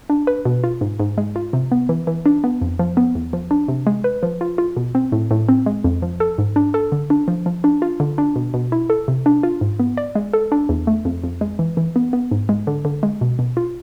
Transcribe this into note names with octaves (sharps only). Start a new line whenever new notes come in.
D4
B4
B2
F4
G#2
G#2
G#3
F4
C3
B3
E3
E3
D4
B3
F2
F3
B3
E2
F3
D4
C3
G#3
B4
F3
F4
F4
B2
C4
A2
A2
C4
G#3
F2
F3
A4
G#2
D4
A4
D3
D4
F3
F3
D4
F4
D3
D4
B2
B2
E4
A4
C3
D4
F4
G#2
B3
D5
G#3
A4
D4
E2
A3
F2
F2
G#3
E3
E3
B3
B3
G#2
G#3
D3
D3
G#3
B2
B2
F4